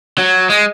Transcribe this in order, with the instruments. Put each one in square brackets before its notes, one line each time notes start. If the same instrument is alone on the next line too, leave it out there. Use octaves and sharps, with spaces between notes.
[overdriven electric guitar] F#3
G#3